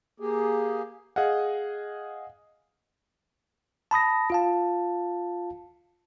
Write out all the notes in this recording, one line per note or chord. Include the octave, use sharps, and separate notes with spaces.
A#3 G4 G#4
G#4 D#5 F5 F#5
A5 B5 D#6 A#6
F4 F5 A5